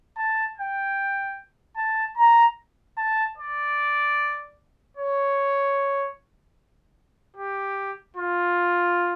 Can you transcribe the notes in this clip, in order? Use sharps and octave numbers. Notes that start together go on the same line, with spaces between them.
A5
G5
A5
A#5
A5
D5
C#5
G4
F4